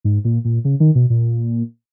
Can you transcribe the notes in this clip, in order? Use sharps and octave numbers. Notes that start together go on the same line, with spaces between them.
G#2
A#2
A#2
C#3
D#3
B2
A#2